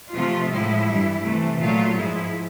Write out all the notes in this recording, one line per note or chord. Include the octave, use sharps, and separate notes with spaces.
C3 F3 A3 F4
A2 F3 G#3 E4
G2 E3 G3
C3 E3 A3
A#2 F#3 A3 F4
G#2 F3 G#3 E4